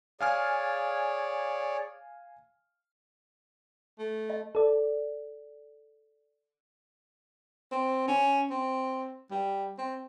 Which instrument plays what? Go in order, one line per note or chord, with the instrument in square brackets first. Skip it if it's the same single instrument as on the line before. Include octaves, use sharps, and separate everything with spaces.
[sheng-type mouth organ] G#4 C#5 D5 [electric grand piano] F5 G#5 F6
[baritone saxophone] A3
[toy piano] D#5
[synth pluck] A4 D5
[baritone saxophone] C4
C#4
C4
G3
C4